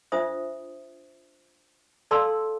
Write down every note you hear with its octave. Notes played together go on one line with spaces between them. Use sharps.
D4 F4 C5 E5 D#6
A4 D5 F5 A5 C6 E6